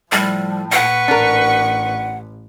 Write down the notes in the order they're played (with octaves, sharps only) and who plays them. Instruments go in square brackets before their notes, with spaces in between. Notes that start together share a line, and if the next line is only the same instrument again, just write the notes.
[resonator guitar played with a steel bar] A2 [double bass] F3 [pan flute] G3
[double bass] A#2 [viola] B4 C#6 [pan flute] F#5
[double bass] A1 [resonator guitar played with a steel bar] D4 A#4